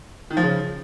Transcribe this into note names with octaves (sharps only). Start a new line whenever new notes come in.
D#3
F3
C#3